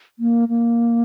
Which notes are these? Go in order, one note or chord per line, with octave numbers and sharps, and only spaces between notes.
A#3
A#3